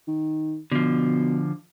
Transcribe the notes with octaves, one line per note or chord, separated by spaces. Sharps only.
D#3
B2 D3 F3